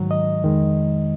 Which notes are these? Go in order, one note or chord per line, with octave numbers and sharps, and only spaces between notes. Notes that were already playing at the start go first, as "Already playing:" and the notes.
Already playing: G#2 D#3 F#3
D#5
F2 D#3 G#3